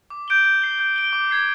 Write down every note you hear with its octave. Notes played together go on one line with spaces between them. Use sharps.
D6
G6 D7 G7
G6
C7 G7
G6
D7 G7
D6
G#6 C7 G7